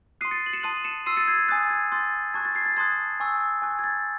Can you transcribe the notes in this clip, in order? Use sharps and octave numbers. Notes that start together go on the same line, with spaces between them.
C6 D#6 F#6 C7 D#7
A6 C#7
F#7
C#7 E7
A5 C6 D#6 F#6 D#7 F#7
C#7 E7
C6 E6 C7 D#7
A6 C#7
G#6 C7
G#6
G#5 D#6 F#6 A6
G#6
C6 D#6 F#6 A6
A5 C#6 F#6 G#6
A6
G#6 C7
A6
A5 C6 D#6 F#6 G#6
G#5 C#6 E6
G#5 C#6 F#6
G#6
A6